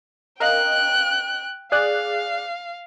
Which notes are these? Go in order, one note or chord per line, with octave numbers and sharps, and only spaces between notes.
A#4 D#5 F5 G5 F#6
G#4 D5 F5 F#6